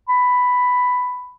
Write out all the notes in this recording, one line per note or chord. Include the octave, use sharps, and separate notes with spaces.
B5